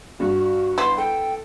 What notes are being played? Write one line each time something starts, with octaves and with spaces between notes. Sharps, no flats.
G2 F#4
B3 E4 C6
A4 G5